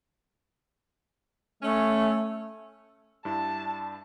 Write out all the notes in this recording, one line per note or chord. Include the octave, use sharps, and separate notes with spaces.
A3 C#4
G2 D4 E4 A5